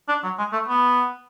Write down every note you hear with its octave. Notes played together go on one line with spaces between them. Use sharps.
D4
F#3
G#3
A3
B3